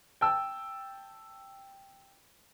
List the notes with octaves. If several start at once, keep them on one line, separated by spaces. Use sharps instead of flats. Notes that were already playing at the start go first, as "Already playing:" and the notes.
G5 A5 E6